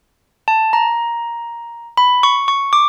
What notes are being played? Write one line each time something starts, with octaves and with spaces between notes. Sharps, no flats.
A5
A#5
B5
C#6
C#6
D6